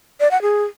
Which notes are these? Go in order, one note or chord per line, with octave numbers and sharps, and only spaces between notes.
D5
F#5
G#4